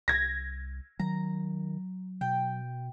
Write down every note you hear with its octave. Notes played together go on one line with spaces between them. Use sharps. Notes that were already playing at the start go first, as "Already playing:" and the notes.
C2 G#6 A#6
D#3 F#3 A#5
B2 G5